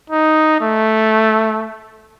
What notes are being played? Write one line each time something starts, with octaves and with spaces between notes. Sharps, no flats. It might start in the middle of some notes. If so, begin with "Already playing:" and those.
D#4
A3